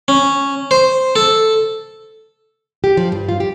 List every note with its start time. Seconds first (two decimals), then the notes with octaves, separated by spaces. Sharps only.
0.08 C#4
0.71 C5
1.16 A4
2.84 G4
2.97 F3
3.12 G2
3.29 F4
3.40 G4